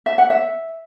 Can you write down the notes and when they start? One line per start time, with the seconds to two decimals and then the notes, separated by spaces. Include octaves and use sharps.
0.06 E5
0.18 F#5
0.30 E5